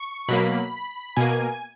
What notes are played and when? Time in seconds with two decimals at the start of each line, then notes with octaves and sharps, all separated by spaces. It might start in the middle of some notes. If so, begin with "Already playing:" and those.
Already playing: C#6
0.29 B2 F#3 A#3 B5
1.17 B2 A#3 G#5